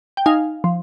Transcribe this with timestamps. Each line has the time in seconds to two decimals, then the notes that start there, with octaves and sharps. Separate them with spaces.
0.17 G5
0.26 D#4 F5 G#5
0.64 F3